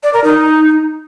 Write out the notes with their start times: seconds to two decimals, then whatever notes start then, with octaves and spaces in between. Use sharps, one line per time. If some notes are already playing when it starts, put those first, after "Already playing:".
0.03 D5
0.13 A#4
0.24 D#4